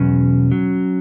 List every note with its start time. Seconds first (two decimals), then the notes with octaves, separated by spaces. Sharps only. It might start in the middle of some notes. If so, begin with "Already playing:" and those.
Already playing: E2 B2 F#3 C#4
0.52 F#3